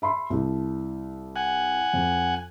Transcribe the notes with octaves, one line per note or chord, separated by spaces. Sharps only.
E5 B5 C6
C2
F#5 G#5
F2